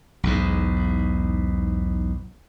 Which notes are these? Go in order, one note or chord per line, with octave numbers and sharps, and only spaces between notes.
B1 E2 G#2